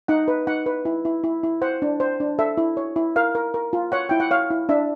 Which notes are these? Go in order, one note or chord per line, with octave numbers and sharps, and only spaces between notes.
D#4 F#5
B4
D#4 F#5
B4
E4
E4
E4
E4
C5 F#5
D4
C5
D4
A4 E5
E4
C#5
E4
A#4 F5
A#4
A#4
F4
C#5 F#5
E4 G5
F#5
C#5 F5
E4
D4 E5